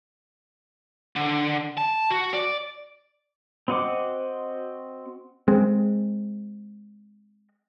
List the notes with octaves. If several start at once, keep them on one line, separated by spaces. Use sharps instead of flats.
D3
A5
F#4
D5
C4 F#4 D#5 F#5 D6
G#3 C4